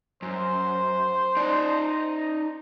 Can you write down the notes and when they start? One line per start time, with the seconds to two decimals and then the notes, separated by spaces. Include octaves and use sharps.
0.22 F#2 C5
1.37 D#4 D5